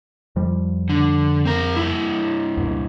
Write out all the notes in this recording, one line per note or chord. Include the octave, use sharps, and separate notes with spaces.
F2 F3 G3
D3
C4 A#4
G2 A#2 E4
C#2 F#2 B2